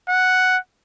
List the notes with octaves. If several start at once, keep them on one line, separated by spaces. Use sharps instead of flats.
F#5